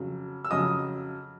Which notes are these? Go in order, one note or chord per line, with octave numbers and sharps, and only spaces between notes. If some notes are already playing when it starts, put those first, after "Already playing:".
Already playing: F2 C#3 F#3
E6
F2 C#3 F#3 D#5 D#6